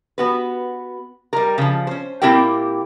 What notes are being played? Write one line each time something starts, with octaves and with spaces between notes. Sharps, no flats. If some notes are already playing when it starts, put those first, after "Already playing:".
B3 F#4 B4
G3 A#4
C#3 F3
C#4 C5
A#2 C4 E4 G4 A#4 G5